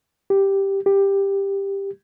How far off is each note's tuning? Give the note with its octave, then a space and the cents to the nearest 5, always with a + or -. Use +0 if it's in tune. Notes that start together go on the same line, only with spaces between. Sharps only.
G4 +0
G4 +10